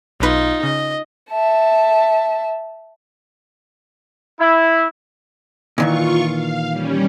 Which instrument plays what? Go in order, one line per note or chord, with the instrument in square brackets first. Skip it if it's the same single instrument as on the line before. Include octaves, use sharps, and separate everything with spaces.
[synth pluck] B1 B4 [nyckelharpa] D#4 F4
[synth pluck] C#3 [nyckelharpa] D#5
[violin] E5 A5
[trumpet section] E4
[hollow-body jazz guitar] A#2 D#3 E3 [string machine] F4 C#6
[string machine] F5
G3 C#4